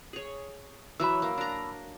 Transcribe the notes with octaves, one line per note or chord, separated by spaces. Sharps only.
G#4 C#5
E3 F#3 E5 B5 E6
A#3
D4 A#5